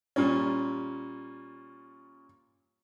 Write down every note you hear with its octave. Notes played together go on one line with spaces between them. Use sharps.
A#2 G3 C#4